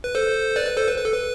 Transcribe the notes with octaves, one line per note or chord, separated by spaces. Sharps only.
B4
A4 C5
B4 D5
B4
A4 C5
B4
B4
A4
B4